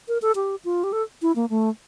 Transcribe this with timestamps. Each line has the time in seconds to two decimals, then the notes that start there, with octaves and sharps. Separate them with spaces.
0.08 A#4
0.22 A4
0.35 G4
0.65 F4
0.83 G4
0.92 A4
1.22 E4
1.35 A#3
1.50 A3